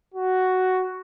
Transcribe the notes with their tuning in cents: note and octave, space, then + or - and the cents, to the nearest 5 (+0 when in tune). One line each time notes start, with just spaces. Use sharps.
F#4 +5